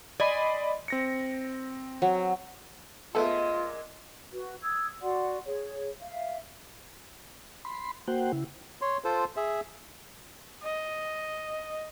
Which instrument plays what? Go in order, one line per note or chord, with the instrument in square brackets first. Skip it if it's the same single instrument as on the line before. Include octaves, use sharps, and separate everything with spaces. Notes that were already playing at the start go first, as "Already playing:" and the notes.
[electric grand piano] D5 D#5 B5 [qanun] G#5 C6
[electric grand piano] C4 A#6 C#7
[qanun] F#3
[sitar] A#2 G#3 [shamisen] A3 B3 A4 [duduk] F4
[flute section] F#4 B4
D#6 E6 G#6
F#4 D5 F#5 C6
G#4 C#5
E5 F5
[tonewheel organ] B5 C6
A#3 F#4 C5 F#5 G5
C#3 E4
[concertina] C#5 C6
F4 A4 C5
G#4 E5
[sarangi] D#5